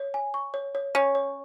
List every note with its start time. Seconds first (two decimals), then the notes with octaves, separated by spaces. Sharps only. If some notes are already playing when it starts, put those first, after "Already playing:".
Already playing: C#5
0.14 G#5
0.34 C#6
0.54 C#5
0.75 C#5
0.95 C#4 C#5
1.15 C#5